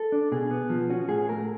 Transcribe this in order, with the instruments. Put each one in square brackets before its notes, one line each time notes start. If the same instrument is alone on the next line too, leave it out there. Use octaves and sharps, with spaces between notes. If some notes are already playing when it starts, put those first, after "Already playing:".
Already playing: [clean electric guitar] A4
D4
B2 G#4
B3
F3
C#4 F#4
A2 G#4
A3 A#4